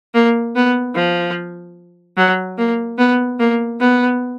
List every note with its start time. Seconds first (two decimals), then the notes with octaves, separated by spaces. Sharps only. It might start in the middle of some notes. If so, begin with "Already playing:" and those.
0.15 A#3
0.56 B3
0.95 F3
2.17 F#3
2.58 A#3
2.98 B3
3.40 A#3
3.80 B3